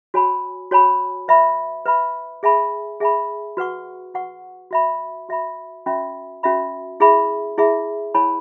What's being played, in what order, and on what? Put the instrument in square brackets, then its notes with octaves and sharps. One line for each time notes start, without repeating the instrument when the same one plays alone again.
[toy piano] F#4 C#5 G#5 B5
F#4 C#5 G#5 B5
B4 E5 B5
B4 E5 B5
G#4 E5 G#5 B5
G#4 E5 G#5 B5
F#4 B4 F#5 C#6
F#4 B4 F#5 C#6
F#4 E5 B5
F#4 E5 B5
C#4 F#4 E5 B5
C#4 F#4 E5 B5
E4 G#4 E5 B5
E4 G#4 E5 B5
E4 C#5 G#5 B5